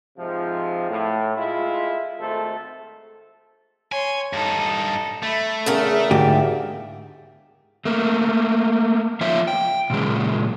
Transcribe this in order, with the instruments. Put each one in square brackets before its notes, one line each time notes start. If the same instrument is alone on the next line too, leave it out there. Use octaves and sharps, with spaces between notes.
[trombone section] G#2 C3 F3
A2
G#3 E4 F4
G#1 A3 A4 C5
[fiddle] C#5 C6 [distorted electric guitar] G#5
[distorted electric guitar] G2 D#4 [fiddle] A4
[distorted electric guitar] A3 [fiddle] E5 B5
[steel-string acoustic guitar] E2 C#3 A#4 [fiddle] E5
[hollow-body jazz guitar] D2 G#2 G4
[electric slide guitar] A3 A#3
F3 F4 C#5 E5 F5
G5
A#2 C#3 G#3